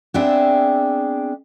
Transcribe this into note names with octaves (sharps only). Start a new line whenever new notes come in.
B3 C4 D4 G#4 E5 G5